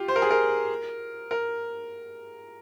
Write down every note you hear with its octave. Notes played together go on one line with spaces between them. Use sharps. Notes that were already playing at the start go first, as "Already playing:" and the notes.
Already playing: F4 G4
C5
A#4
G#4
A#4
A#4